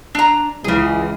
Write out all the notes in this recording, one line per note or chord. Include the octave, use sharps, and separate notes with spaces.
D4 A#5
C#2 C#3 E3 G#4